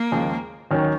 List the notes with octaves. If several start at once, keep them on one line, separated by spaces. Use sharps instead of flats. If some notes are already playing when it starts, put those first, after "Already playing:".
Already playing: A#3
D#2 C#3 F3 G#3
D#2 D#3 F#3 C#4